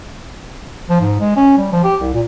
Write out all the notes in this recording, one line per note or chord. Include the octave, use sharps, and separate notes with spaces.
F3
G#2
G#3
C#4
G3
F3
G4
C2
A#2